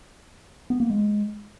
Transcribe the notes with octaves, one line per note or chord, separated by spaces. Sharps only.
B3
A#3
G#3